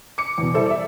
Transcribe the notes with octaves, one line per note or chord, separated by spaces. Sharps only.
D6 C#7
E2 B2
G3 E4 A4 C5
D5 E5